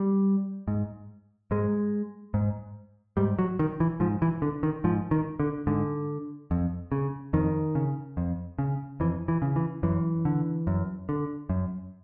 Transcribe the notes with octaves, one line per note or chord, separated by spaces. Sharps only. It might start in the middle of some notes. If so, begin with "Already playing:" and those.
Already playing: G3
G#2
G#2 G#3
G#2
G#2 G3
F#3
D#3
E3
G#2 F3
E3
D3
D#3
G#2 F3
D#3
D3
G#2 D3
F2
C#3
F2 D#3
C#3
F2
C#3
F2 E3
E3
C#3
E3
F#2 E3
D3
F#2
D3
F#2